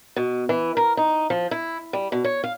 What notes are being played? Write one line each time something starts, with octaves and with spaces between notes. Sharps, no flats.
B2
E3
A#4
D#4
F3
E4
G3
B2
C#5
F5